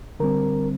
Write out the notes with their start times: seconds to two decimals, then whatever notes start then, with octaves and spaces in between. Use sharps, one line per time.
0.20 D3 G3 C4 A#4